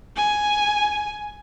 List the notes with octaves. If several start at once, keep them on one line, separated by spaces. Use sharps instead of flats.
G#5